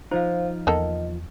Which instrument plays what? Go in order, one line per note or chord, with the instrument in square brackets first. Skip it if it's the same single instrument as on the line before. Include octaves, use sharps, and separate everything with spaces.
[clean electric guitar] F3 F4 [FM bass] D#4 [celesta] C5 F5
[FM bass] E2 [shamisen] D#3 A#3 A4 [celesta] D#5